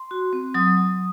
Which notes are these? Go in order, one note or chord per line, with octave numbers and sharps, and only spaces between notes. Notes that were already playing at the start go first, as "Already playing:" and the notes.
Already playing: C6
F#4
C4
F#3 D#6
F#3